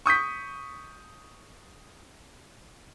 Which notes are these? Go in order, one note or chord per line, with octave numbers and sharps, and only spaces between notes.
C#6 D#6 G6 B6